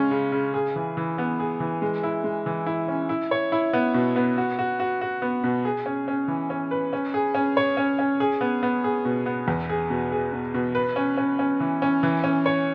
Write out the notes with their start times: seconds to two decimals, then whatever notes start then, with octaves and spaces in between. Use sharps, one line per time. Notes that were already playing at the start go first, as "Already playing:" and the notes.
Already playing: C#3 G#3 C#4
0.11 C#3
0.32 C#3
0.54 G#4
0.76 E3
0.97 E3
1.18 B3
1.40 G#4
1.60 E3
1.82 G#3
2.03 E4
2.24 G#3
2.46 E3
2.67 E4
2.88 C#4
3.09 E4
3.31 C#5
3.52 E4
3.73 B3
3.94 B2
4.16 B3
4.38 F#4
4.59 F#4
4.80 F#4
5.01 F#4
5.22 B3
5.44 B2
5.65 G#4
5.86 C#4
6.08 C#4
6.28 E3
6.50 C#4
6.71 B4
6.93 C#4
7.14 G#4
7.35 C#4
7.57 C#5
7.77 C#4
7.99 C#4
8.20 G#4
8.41 B3
8.63 B3
8.84 G#4
9.05 B2
9.26 B3
9.48 E2
9.69 G#4
9.90 B2
10.12 G#4
10.33 B2
10.54 B2
10.75 B4
10.96 C#4
11.17 C#4
11.39 C#4
11.60 E3
11.82 C#4
12.03 E3
12.24 C#4
12.46 C#5